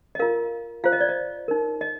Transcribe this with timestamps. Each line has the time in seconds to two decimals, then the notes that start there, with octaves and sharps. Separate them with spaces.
0.15 D#5
0.19 F4 A#4 F5
0.84 F4 C5 F5
0.92 D#5
1.01 D5
1.09 D#5
1.48 D#4 A#4
1.81 D#5